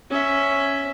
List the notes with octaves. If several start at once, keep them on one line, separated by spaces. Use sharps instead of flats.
C#4 E5